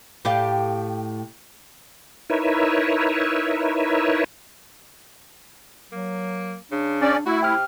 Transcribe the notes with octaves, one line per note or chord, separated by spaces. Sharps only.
A2 G4 F5
D#4 E4 A#4 B4 C#5 E5
F#3 A#3
C#3 D4
C#4 D5
A3 E4 F#4
C3 G5 F6